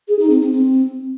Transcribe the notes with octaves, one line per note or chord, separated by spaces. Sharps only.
G#4
D#4
C4
C4
C4